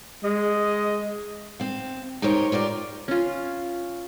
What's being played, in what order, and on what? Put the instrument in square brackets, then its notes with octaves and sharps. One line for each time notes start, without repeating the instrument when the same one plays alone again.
[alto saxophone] G#3 [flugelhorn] D#5
[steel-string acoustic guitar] C4 F5
D#4 G4 A#4 C5 C#5
F4 G4 A#4 D5
[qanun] C#4 F4